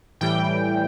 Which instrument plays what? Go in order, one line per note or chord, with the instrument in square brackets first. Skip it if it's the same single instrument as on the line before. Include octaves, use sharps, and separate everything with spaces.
[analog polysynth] A2 E3 G3 G5